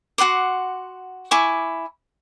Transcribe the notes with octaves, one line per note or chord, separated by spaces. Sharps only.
F#4 F#5 C6 D6
E4 G#5 C#6 D6